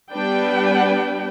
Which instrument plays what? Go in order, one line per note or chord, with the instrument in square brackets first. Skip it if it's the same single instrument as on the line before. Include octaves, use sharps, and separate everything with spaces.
[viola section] G3 B3 D4 B4 G5